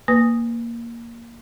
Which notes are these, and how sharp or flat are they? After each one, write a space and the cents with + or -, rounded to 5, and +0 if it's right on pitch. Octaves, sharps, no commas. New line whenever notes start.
A#3 +0 B4 +15 D#6 +0